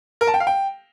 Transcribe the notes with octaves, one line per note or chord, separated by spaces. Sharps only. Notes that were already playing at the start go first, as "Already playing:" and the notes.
A#4
A5
G5
F5
G5